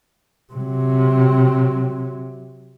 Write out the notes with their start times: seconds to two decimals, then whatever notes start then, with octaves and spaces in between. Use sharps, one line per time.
0.53 C3 F#3